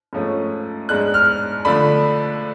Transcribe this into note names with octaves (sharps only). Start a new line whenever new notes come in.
G#2 F3 A3 C#4
G#2 G#3 D4 F#6
F6
D3 F3 A3 D4 B5